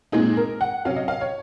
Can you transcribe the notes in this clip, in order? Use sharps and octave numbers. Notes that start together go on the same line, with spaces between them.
A#2 G#3 C4 D#4 G#4
A#4
F#5
C3 F#3 C#4 F5
D#5
F5
C#5